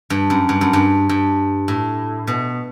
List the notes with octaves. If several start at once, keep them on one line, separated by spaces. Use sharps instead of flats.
G2
F#2
G2
F#2
G2
G2
A2
B2